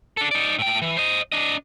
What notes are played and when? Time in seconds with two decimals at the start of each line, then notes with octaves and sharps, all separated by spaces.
0.17 D4 A4
0.31 D#4 D5
0.59 A2 G5
0.82 E3
0.97 C5 D#5
1.32 D4 D#5